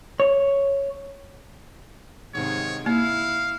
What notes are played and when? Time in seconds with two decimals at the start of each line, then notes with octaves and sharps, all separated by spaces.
0.20 C#5
2.34 G#2 C3 D#3 C#5
2.86 A#3 E4 F5